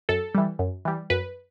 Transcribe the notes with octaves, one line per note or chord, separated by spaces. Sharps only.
F#2 A4
E3 G3
F#2
E3 G3
F#2 B4